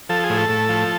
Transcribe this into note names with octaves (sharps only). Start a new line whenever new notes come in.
F3 A4
G#4
A2
A4
A2
F3